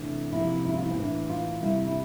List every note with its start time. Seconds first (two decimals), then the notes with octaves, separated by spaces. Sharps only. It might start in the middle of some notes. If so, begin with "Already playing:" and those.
Already playing: C3 E3 A3 D4
0.33 C3 F3 A#3 E4
0.65 E4
0.74 F4
0.82 E4
0.91 C4
0.97 A2 E3 A#3 D4
1.30 F4
1.62 C3 G3 A#3 E4
1.87 E4